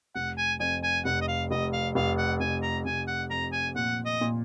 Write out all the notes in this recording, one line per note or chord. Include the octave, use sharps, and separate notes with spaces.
F1 F#5
G#5
F2 G#5
G#5
F1 F#5
D#5
F5
F1 D#5
F5
F1 F5
F#5
F1 G#5
A#5
F1 G#5
F#5
F2 A#5
G#5
A#2 F#5
D#5
A#2